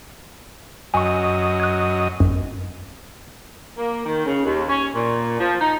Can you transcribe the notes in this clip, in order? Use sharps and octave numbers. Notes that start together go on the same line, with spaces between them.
F#2 D#5 G#5 C#6
F#6 G#6
G#1 F#2
A#3
D#3
C#3
D#2
C#4
A#2
F3
D#4